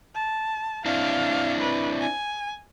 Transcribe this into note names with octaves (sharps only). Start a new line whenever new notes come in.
A5
C4 D4 E4 F5
B4
G#5